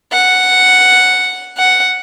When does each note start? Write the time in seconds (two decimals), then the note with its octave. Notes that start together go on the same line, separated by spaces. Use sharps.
0.12 F#5
1.57 F#5